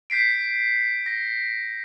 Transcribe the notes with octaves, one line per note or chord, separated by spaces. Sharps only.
G6 B6 C7 D7
A#6